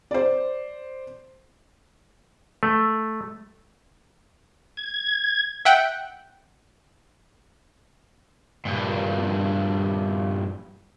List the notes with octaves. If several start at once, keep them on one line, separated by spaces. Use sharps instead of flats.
C5 D5
A3
G#6
E5 F#5 G5 F#6
G2 A#2